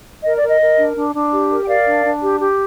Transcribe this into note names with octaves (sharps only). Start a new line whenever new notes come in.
A#4 D#5
D5
A#4
D#5
A#4
D4
D4
D4
G4
A#4
G5
A#4 D5 F5
D4
D4
G4
G4